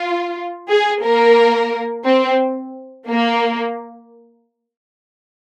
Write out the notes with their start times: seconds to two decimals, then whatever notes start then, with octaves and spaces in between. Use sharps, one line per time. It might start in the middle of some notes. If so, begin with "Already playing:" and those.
Already playing: F4
0.69 G#4
1.03 A#3 A#4
2.05 C4
3.09 A#3